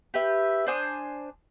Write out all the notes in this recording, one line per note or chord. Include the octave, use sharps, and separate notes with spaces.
G4 B4 E5
D4 C5 G#5 D#6